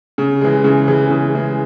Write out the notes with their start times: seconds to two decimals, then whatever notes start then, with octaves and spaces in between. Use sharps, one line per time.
0.18 C#3
0.41 E3 G#3
0.64 C#3
0.88 E3 G#3
1.10 C#3
1.35 E3 G#3